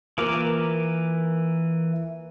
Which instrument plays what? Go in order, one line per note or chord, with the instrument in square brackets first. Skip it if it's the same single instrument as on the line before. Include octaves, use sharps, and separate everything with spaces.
[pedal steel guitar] E3 A#4 D6 [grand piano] A#3 F4